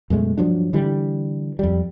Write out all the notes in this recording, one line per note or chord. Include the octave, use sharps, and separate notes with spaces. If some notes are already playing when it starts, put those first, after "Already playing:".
F#2 B2 G#3 A3
G2 F3 F#3 D4
D3 E3 G3
F2 G3